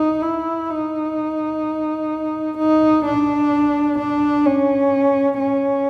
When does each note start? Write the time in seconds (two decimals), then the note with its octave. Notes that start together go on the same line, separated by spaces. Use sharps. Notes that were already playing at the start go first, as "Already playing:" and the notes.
Already playing: D#4
0.22 E4
0.70 D#4
2.57 D#4
3.05 D4
3.98 D4
4.45 C#4
5.39 C#4